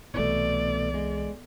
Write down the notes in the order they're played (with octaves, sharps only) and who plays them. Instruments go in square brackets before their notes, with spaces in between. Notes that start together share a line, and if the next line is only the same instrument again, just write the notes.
[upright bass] C2 E3 [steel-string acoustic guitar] B2 A3 [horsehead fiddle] D5
[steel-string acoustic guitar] G#3